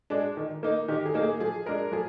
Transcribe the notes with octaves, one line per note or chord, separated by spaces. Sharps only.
G#3 D4
D#3
A#3 D#4
D#3 G4
G#4
A#3 D#4
G#4
F3 G#4
G#3 D4 A#4
F3 G#4